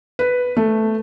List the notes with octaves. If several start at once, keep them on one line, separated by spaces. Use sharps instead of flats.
B4
A3